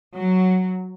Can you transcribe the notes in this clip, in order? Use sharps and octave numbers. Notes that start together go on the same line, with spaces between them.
F#3